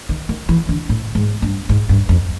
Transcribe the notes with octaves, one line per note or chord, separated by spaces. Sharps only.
D#3
D#3
E3
D3
A2
G#2
G2
G#2
G2
F2